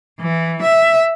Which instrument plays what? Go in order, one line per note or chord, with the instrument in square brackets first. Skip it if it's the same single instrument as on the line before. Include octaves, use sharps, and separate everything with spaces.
[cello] E3
E5